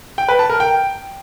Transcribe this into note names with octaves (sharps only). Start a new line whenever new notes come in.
G5
B4
A5
A#4
G5